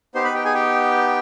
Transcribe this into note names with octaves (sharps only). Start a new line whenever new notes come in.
B3 D#4 G4 C5 C6
B4 B5
G4 G5
G#4 G#5
G4 G5